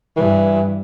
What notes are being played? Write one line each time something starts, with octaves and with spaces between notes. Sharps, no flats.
G2 E3